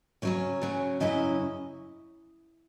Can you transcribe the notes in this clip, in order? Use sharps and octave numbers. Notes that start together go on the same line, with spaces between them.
C#3 F#3 C#4 C#5
C#3 F#3 C#4
F#2 C#3 F#3 C#4 E4 D#5